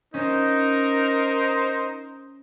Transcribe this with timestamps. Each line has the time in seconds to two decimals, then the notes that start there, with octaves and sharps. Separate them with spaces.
0.14 C#4 D#4 A#4 C5 D#5